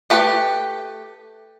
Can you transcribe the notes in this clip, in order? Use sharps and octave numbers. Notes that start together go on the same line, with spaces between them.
A3 G4 B4